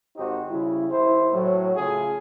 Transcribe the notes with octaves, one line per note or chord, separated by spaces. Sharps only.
G#1 D#4 F#4 G4 C5
C#3 G3 E4
D#2 E4 C5
A2 F#3
C#3 A3 F4 G#4